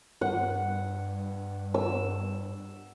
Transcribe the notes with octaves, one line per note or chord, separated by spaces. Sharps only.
G2 F#5
E6